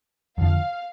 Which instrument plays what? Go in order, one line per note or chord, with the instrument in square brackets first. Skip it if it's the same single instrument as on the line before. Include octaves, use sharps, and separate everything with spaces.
[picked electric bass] F2 D3 F3 [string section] F5